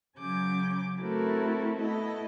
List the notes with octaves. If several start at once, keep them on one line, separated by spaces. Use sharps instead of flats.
C#3 F#3 C#4 G#5 D6 G6
A3 C4 E4 F#4 A4 A#4
A3 B3 E4 A4 D#5